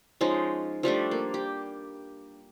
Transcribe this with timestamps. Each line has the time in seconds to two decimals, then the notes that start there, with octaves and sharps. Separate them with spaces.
0.21 F3 G#3 C#4 D#4
0.83 F3 G3 A3 D4
1.11 A#3
1.34 G4